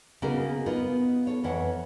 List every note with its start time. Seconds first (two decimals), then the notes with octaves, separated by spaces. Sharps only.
0.22 C#3 A#3 B3 D#4 F#4 G#4
0.66 B3 D#4 F4
1.27 A4 C#5
1.44 F2 E3 C#5 F#5